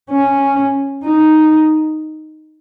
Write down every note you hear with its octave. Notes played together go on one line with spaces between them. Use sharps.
C#4
D#4